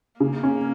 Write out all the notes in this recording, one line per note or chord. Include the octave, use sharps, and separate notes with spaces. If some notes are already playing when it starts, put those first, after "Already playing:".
C#3 A#3
C#4